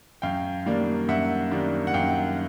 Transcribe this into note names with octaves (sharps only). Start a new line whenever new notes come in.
F#2 F5 G5
D#3 G3 A#3 D4
F#2 E5 F#5
D#3 G3 A#3 D4
F#5
F#2 F5 G5